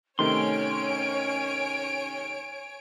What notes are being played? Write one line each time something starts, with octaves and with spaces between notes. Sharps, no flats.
C3 D#3 A3 C#4 C#5 G#5 C6 D7